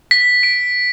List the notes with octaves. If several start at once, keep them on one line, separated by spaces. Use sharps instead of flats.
B6
D7